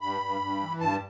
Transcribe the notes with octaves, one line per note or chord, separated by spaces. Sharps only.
G2 B5
G2
G2
E3
G2 A5